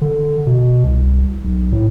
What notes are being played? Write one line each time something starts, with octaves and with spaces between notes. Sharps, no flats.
D3
B2
C2
B1
A2